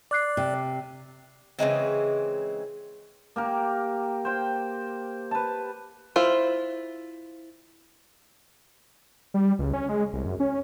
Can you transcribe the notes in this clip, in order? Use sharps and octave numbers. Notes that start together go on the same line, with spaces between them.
D5 D6 F#6 C7
C3
C#3 E3 G#3 C4
A#3 G4 A#4
C5 G5
B4 A5
E4 F4 C5
G3
C#2
C#4
G#3
C2
F#2
C#4